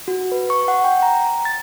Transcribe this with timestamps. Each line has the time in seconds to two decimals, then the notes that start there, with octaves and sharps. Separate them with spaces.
0.08 F#4
0.32 B4
0.50 C#6
0.68 F#5
0.84 G5
1.02 A#5
1.45 A6